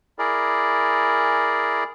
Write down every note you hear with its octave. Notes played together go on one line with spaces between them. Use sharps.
E4 G#4 A#4 D5